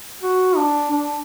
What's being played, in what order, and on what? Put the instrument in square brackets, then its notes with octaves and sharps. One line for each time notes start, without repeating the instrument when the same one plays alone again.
[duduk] F#4
D4
D4